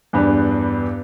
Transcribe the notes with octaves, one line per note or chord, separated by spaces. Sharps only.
E2 G2 B3 D4